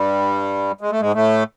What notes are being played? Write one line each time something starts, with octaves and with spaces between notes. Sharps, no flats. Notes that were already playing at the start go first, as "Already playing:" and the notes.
Already playing: G2 G3
G#3
A3
G#2 G#3
A2 A3